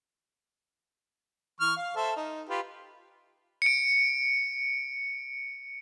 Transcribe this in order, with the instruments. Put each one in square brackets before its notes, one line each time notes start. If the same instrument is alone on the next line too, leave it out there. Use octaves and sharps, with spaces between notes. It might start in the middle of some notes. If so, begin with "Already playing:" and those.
[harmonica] E3 C#6 F6
F5
A4 C5 E5
D#4
F4 G4 B4
[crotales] C#7 D7